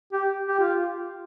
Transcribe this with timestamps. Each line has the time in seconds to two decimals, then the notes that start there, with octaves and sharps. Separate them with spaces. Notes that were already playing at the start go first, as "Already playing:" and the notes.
0.13 G4
0.47 G4
0.60 F4